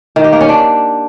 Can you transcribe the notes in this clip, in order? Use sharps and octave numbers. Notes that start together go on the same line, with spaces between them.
D#3
G4
A#3
C#4
D4